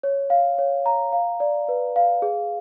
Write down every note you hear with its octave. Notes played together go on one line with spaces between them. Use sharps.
C#5
F5
C#5
A#5
F5
D5
B4
F5
G#4